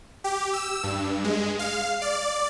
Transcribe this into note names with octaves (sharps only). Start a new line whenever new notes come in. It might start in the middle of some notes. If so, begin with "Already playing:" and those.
G4
E6
G2
G#3
F5
D5